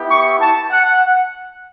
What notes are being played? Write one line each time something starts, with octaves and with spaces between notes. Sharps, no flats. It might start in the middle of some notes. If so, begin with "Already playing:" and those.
Already playing: B3 E4 G4
C#6
A5
F#5